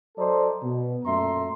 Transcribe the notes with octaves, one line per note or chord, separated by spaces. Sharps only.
F#3 A4 C5 D5 D#5 A#5
B2
F#2 A#2 A3 E5 A#5 C6